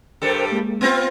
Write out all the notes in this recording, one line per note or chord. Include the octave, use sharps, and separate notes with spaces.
G2 G3 A4 A#4 C5 G5
G#3 A#3
B3 C4 F4